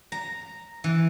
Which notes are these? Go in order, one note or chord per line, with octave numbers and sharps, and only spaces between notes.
A#5
E3